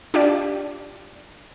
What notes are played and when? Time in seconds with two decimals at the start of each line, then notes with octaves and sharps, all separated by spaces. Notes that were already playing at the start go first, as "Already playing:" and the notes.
0.14 D4 F4 G4 D5